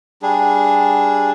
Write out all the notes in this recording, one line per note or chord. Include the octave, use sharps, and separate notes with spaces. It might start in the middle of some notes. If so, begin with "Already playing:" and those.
G3 D4 G#4